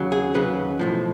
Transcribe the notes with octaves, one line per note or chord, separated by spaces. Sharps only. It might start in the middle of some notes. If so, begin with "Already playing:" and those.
Already playing: D#2 C#3 F#3
G#4
D#2 C#3 F#3 B4
B1 A2 F3